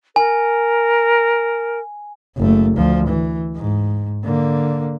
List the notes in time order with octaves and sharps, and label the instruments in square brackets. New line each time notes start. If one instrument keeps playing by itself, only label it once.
[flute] A#4 [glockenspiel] G#5
[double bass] F#1 A3
D2 F3
E3
G#2
D3 A#3